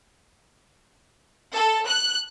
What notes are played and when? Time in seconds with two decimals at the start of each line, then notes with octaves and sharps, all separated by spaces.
1.54 A4
1.88 F#6